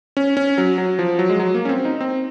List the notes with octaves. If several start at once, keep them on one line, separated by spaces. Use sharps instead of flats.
C#4
C#4
F#3
F#3
F3
F#3
G#3
F#3
A#3
C#4
C4
D#4
C4